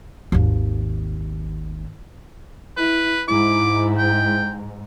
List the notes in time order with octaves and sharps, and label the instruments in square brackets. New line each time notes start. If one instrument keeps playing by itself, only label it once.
[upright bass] G#1 D#2
[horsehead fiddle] E4 [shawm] B4
[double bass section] G#2 [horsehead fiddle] E4 [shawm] D6
[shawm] G5